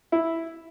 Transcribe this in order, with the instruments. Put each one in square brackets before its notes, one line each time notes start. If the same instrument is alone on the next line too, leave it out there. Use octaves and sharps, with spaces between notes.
[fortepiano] E4